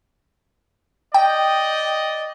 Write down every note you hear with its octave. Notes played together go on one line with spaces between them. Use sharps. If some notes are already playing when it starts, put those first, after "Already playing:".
D5 D#5 G5